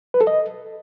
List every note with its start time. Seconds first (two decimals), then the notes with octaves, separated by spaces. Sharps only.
0.14 B4
0.21 A4
0.27 D#5